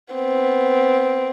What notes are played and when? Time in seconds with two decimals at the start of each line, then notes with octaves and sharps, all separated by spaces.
0.14 B3 C4